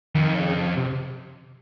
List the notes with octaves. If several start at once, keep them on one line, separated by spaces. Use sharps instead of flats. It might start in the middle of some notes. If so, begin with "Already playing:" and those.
F2 D#3
C#3
C3